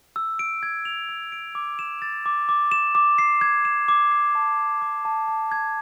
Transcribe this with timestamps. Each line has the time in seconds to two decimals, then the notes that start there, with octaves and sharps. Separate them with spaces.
0.16 E6
0.39 D7
0.63 G#6
0.85 F7
1.09 E6
1.32 D7
1.55 D6
1.79 E7
2.02 A6
2.26 D6
2.49 D6
2.71 E7
2.95 D6
3.18 C7
3.41 G#6
3.65 E7
3.88 D6
4.11 C7
4.35 A5
4.58 G#6
4.82 D6
5.05 A5
5.28 A5
5.52 G#6